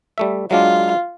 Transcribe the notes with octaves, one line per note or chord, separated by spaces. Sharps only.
G3 A3 E5
F#3 G#3 D4 F4